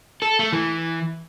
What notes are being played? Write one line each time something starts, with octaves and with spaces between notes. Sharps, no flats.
A4
A3
E3